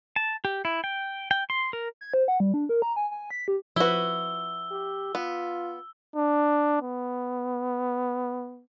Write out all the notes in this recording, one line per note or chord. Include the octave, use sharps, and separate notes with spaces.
A5
G4
E4
G5
G5
C6
A#4
G#6
C5
F#5
G3
D4
A#4
A#5
G#5
G#5
B6
G4
F3 E4 F#4 B4 E6 G7
G4
B3 F4
D4
B3